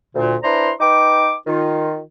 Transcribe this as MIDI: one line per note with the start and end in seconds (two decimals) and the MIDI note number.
0.14 0.35 38
0.14 0.35 46
0.43 0.71 62
0.43 0.71 64
0.43 0.71 71
0.43 0.71 72
0.43 0.71 82
0.43 0.71 84
0.80 1.33 63
0.80 1.33 71
0.80 1.33 79
0.80 1.33 86
1.47 1.99 51
1.47 1.99 65